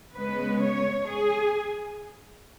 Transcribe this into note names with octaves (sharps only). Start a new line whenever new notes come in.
C#3 G#3 B3 B4
C#5
G#4